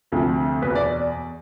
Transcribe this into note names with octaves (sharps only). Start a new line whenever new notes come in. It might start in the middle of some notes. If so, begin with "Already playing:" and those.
D2 C3 F3
E2 B2 B4
D5